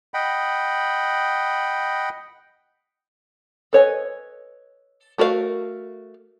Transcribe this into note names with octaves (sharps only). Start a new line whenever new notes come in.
D#5 F#5 G5 B5
A4 B4 C#5 D#5 G#5
A3 F#4 A#4 C#5 F5